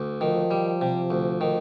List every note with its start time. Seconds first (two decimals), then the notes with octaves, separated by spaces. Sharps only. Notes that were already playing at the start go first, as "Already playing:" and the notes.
Already playing: D2
0.21 D#3 F3
0.51 G3
0.81 C3
1.10 D2
1.41 D#3